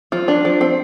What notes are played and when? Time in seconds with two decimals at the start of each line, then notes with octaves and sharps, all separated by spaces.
0.12 F3 F4
0.28 D4
0.45 F3
0.61 C4